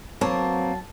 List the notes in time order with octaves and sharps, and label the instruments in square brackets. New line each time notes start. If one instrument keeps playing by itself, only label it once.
[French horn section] F#3 [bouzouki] A#3 [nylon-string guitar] C4 B4 C#5 [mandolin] A5